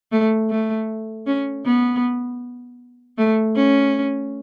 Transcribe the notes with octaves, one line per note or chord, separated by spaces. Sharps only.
A3
A3
C#4
B3
A3
C#4